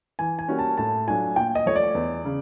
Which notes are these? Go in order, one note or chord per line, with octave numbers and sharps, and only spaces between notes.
E3 G#5
G#5
G3 A#3 C#4 F#4
A5
A2 A5
F#3 A3 D4 F4 G#5
A#2 G5
D#5
F3 A3 C#5
D5
E2
C#3